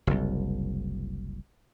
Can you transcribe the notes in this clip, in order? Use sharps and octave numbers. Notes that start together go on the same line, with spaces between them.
F#1 C2